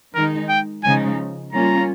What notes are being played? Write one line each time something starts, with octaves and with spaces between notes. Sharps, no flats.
D#3 G#3 D#4 A#4
G5
C#3 F3 G#3 D#4 G#5
G3 A#3 C#4 F4 A#5